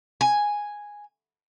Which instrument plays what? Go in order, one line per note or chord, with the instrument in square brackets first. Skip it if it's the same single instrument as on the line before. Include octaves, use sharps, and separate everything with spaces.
[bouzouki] G#5